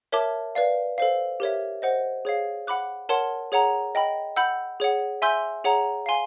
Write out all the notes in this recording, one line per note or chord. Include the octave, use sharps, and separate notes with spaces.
A#4 C#5 E5 A5 D6
B4 D5 F5
A4 C5 F5
G4 A#4 C#5 E5
C5 D#5 F#5
G#4 C#5 F5
F#5 B5 D6 F#6
A#4 C#5 F#5 A5 C6
G#4 C#5 F#5 A#5
D#5 G5 B5
F#5 B5 E6 G6
G#4 C#5 F#5
E5 G#5 C6 E6 G6
G#4 C#5 F#5 A#5
F5 G#5 C6